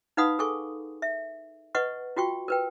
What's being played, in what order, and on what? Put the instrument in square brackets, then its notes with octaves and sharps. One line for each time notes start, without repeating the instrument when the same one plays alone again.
[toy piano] D#4 B4 F5 F#5 B5 D#6
G#4 A4 G#5 C#6
E5
B4 D#5 F#5 C#6
F4 F#4 G5 C#6
A#4 B4 G5